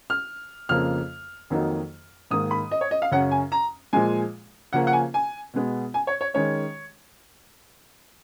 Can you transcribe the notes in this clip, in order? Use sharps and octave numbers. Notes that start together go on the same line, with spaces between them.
F6
F2 C#3 F3 A#3 F6
F2 D#3 F#3 A#3 D#4
G#2 D#3 A#3 D#6
B5
D#5
C#5
D#5
F5
F#2 C#3 F#3 C#4 F#5
G#5
A#5
A#2 F3 G#3 G#5
C#3 F3 A#3 C#4 F#5
F#5
G#5
G#5
B2 G#3 B3
G#5
C#5
C#5
D#3 G#3 C#4 C#5